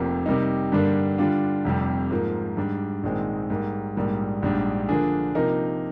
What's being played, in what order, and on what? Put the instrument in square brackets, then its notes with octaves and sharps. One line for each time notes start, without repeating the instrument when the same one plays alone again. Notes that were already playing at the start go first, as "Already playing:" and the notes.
Already playing: [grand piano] F1 F2 C3 F3 A#3
C3 G3 A#3 D#4
G2 D3 G3 A#3 D4
D3 G3 D4 F4
F1 F2 C3 G3
G#2 F3 A#3
G#2 G3 D4
A#1 G#2 D#3 G#3 C4
G#2 G3 A#3
A#1 G#2 G3 A#3
A#1 G#2 G3 D4
D3 F3 A#3 D4 G#4
C3 F3 A#3 D#4 A#4